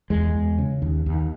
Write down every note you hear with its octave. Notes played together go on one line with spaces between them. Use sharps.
E2 G#3
E2
C#3
D#2
D#2